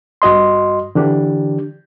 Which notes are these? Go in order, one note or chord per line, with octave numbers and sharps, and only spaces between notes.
G2 F#4 D#5 C6
D3 E3 D4 G4